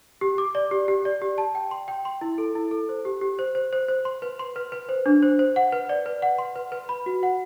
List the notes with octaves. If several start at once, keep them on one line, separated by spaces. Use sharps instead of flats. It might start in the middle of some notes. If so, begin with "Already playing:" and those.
G4
D6
D5
G4
G4
D5
G4
A5
G5
C6
G5
C6
E4
A4
E4
A4
C5
G4
G4
C5
C5
C5
C5
C6
B4
C6
B4
B4
C5
D4
C5
C5
F#5
B4
D5
B4
F#5
C6
B4
B4
B5
F#4
F#5